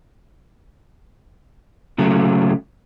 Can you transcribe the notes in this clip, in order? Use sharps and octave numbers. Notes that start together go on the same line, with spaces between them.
C#3 F#3 A3